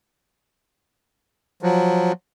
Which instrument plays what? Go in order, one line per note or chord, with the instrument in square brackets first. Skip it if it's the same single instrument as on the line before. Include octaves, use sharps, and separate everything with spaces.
[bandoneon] F3 F#3